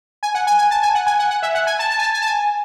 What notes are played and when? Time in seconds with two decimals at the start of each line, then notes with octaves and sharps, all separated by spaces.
0.23 G#5
0.35 F#5
0.47 G#5
0.59 G#5
0.71 A5
0.82 G#5
0.95 F#5
1.07 G#5
1.19 F#5
1.31 F#5
1.43 E5
1.55 F#5
1.67 G#5
1.79 A5
1.91 A5
1.98 G#5
2.03 A5
2.14 G#5
2.22 A5
2.26 G#5